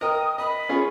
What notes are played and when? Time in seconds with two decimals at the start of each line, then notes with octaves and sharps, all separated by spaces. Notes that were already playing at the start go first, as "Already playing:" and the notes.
0.01 A#4 D#5 G5 D#6
0.38 D#5 B5
0.69 C#4 F4 G#4